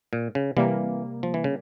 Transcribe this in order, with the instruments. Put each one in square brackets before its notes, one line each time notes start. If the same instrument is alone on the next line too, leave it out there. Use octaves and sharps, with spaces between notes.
[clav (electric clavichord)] A#2
C#3
[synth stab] C3 G3 A#3 [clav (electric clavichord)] E3
[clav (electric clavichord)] F3
E3
C#3